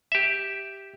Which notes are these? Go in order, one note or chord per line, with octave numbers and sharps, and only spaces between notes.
G4 E5